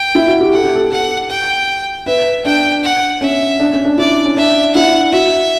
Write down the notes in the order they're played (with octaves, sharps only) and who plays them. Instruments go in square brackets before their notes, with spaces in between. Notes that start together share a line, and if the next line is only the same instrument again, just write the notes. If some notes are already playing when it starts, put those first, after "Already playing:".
Already playing: [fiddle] G5
[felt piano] E4
F#4
G4
[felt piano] A4 [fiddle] F#5
[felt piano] G4
A4
[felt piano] A4 [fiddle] F#5
[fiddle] G5
[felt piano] B4 [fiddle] E5
[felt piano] D4 [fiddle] G5
[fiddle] F#5
[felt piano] C#4 [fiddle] E5
[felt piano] D4
C#4
D4
[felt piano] E4 [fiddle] D5
[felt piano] C#4
[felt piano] D4 [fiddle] E5
[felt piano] E4 [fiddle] F#5
[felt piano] F#4 [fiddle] E5